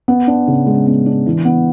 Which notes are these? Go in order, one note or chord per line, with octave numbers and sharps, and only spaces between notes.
B3
D4
C#3
G#3
B3
D4
E3
B3